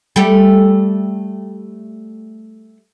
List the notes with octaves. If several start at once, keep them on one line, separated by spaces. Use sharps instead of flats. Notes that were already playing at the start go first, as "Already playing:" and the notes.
G3 A3 G4